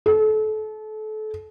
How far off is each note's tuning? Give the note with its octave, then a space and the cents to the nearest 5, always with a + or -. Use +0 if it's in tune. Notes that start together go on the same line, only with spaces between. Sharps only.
A4 -30